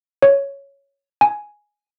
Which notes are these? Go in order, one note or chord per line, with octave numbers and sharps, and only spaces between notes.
C#5
G#5